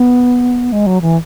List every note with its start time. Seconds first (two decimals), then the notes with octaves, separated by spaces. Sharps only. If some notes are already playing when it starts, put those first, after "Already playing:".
Already playing: B3
0.72 G#3
0.86 F#3
1.01 E3